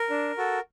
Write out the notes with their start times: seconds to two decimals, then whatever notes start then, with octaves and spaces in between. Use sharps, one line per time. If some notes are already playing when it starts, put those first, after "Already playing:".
Already playing: A#4
0.10 D4
0.38 F#4 A4